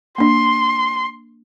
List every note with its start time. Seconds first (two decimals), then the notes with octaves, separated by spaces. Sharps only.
0.18 A#3 D4 C6